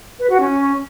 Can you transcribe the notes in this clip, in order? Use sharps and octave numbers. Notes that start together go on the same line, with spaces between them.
B4
F#4
C#4